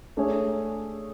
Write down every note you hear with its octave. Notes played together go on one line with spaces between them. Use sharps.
A3 D4 G#4 C#5